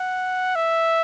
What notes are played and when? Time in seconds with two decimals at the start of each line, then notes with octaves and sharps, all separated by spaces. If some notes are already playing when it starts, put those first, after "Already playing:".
Already playing: F#5
0.56 E5